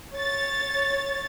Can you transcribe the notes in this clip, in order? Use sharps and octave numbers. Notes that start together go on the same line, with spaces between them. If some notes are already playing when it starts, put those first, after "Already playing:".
C#5 A6